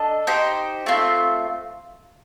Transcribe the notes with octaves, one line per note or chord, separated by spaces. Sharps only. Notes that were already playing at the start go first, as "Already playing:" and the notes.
Already playing: D4 A4 D#5
D#4 G4 C5 G5
A3 C4 F4